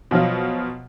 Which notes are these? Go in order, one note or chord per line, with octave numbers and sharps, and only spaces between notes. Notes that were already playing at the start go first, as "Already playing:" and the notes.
B2 F3 F#3 F4